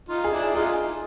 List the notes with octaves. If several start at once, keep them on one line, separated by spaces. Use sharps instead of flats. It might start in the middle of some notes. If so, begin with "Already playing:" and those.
D#4 F4
G#4
D4 E4
D#4 F4 G#4